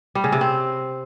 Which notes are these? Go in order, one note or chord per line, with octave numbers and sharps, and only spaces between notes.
G3
C#3
C3
C4